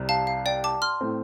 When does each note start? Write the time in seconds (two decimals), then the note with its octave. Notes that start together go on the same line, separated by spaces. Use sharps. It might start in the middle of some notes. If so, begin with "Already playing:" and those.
Already playing: C2 C3 G3
0.09 F5 A5
0.27 F5
0.46 D5 G5
0.64 A5 D6
0.82 C6 F6
1.01 A2 A3 C4